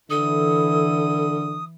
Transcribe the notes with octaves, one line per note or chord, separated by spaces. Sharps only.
D3 E3 E4 A4 D#6